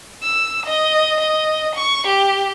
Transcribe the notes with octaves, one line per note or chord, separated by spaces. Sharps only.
E6
D#5
D#5
C#6
G4